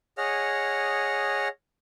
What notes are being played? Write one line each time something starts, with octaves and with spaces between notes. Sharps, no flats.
G#4 C#5 D#5 F#5 F6